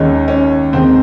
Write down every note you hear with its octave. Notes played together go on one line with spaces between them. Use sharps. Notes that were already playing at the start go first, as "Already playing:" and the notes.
Already playing: D#2 D#3 G#3 C#4
C#4
D#2 D#3 G#3 C4